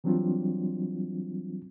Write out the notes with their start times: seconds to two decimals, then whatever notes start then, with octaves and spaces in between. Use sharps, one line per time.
0.04 E3 F#3 G3 C4 D4 F4